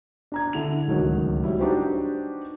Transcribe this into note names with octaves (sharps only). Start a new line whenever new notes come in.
D4 A#5 G#6
D3 E4 F7
D1 C#2 D#3 F#3
F#3 G3 E4
D4 D#4 F#4 G4 B4 C5